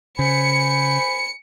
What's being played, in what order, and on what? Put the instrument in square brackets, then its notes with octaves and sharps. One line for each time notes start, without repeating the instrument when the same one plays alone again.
[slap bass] C#3 [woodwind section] C5 G#5 B5 [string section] C#7